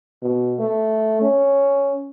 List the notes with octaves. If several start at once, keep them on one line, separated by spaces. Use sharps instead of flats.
B2
A3
C#4